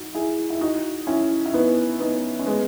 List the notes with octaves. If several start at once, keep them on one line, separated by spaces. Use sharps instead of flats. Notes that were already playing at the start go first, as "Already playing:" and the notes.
Already playing: D#4 F#4
E4 G#4
E4
D#4 F#4
C#4 E4
E4
B3 D#4
B3 D#4
C#4
G#3 B3